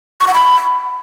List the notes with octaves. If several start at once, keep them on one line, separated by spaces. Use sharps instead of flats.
C#6
F#5
B5